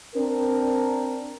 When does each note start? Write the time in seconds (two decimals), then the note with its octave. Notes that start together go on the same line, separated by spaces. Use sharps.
0.16 C4 D4 A#4